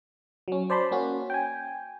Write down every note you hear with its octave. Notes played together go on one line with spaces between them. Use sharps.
F#3 C#4
C5 D5 A5 B5 C6
A#3 C#4 F#4
G5 G#5